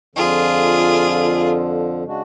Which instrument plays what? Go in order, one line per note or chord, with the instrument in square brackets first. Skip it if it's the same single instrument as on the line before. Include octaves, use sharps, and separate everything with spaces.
[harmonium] F2 D3 F3 [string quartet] F4 G#4
[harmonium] C#3 G#3 D4 F#4